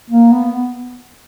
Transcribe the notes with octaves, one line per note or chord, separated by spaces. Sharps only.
A#3
B3